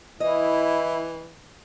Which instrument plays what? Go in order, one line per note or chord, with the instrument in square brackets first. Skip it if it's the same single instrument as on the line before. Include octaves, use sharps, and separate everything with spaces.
[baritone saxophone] E3 [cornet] E4 [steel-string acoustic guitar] D#5